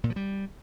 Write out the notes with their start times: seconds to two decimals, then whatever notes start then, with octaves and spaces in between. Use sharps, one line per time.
0.04 A#2
0.10 F3
0.16 G3